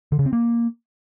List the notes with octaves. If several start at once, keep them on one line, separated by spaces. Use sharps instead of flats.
D3
C#3
C4
A#3